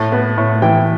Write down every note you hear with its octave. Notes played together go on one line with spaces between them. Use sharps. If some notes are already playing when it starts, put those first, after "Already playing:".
Already playing: A2
B3
A2
E3 G5